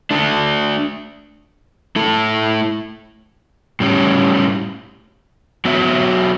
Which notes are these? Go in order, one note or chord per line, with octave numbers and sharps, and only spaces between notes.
A3 D4 A4
A3 E4 A4
A2 G3 C#4
F#3 B3 F#4 C#5 E5